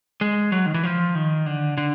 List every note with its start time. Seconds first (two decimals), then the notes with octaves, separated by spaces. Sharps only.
0.21 G#3
0.52 F#3
0.66 D#3
0.74 E3
0.83 F3
1.15 D#3
1.46 D3
1.77 D3